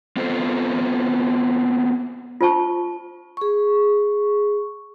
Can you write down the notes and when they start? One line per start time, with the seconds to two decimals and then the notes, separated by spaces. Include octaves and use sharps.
0.17 B3 C4 F4 A4 C5
2.41 F4 C5 A5 C#6
3.37 G#4 C#6